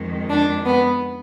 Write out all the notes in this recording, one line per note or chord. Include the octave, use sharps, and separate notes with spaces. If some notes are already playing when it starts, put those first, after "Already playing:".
Already playing: F2 D#3 G#3
D4
B3